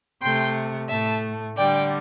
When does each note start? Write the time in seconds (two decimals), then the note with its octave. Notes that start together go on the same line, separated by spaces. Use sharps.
0.22 C3 A3 G5 C6
0.89 A2 A3 E5 A5
1.56 D3 G3 D5 G5